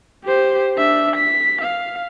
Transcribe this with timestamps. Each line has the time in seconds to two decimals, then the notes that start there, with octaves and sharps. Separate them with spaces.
0.25 G4 C5
0.76 D4 E5
1.16 B6
1.61 F5